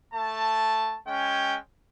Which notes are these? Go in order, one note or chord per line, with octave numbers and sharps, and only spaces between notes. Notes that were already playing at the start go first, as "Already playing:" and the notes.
A3 A5
G#3 C#4 G5